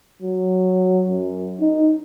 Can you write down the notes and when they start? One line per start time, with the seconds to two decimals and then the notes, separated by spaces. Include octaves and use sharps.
0.22 F#3
1.09 F#2
1.60 D#4